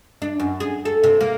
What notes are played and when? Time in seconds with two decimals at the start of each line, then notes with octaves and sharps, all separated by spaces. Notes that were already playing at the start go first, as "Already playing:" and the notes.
0.22 D4
0.40 F#2
0.60 G#4
0.85 A4
1.04 C3
1.21 A#3